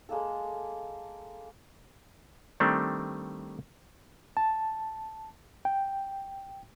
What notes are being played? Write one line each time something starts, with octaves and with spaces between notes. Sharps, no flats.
G#3 A#3 A4
D#3 G3 A3 C4 D4
A5
G5